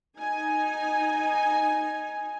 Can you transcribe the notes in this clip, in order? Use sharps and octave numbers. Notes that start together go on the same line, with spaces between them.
D#4 G#5